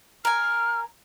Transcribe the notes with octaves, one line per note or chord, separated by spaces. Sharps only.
A#4 G#5 F6